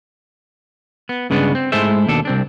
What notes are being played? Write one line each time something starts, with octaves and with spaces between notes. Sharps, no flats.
B3
G2 C#3 G#3 B3 C#4 D4
C4
G#2 G#3 A3 E4 C5 E5
D#2 B2 D4 A4
C2 C4 D4